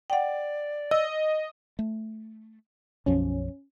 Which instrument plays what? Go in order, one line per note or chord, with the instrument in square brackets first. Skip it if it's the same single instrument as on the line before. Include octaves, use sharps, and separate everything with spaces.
[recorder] D5 [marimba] F#5 G5
[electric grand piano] D#5 [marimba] E6
[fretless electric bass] A3
[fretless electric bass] B1 F#2 F3 [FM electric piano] C#4